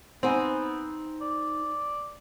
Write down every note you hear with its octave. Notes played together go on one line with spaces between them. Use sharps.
B3 C4 D#4 F#5 G#5
D5